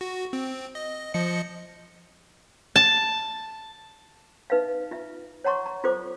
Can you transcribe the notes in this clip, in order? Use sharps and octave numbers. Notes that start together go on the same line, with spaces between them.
F#4
C4
D#5
F3 D#5 C#7
A5
D#4 B4 E5 F5
F4 E5
C#5 F#5 A#5 C6 C#6
A#5
F4 A4 C5 D6